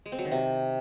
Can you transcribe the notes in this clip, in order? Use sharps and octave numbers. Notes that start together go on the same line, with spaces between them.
G#3
C4
F#3
D#3
C3